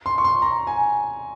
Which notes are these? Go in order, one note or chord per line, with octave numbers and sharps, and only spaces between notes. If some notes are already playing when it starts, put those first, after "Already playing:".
C6
C#6
C6
A#5
G#5